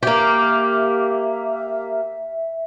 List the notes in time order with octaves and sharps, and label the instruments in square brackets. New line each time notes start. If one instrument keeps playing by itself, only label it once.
[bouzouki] A#3 G4 [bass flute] E5